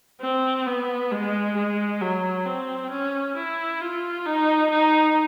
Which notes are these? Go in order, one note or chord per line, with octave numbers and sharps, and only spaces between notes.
C4
B3
G#3
G#3
F#3
C4
C#4
E4
F4
D#4
D#4